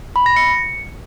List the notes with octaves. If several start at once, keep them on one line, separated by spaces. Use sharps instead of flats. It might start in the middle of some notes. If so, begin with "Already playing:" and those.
B5
A#6
C#7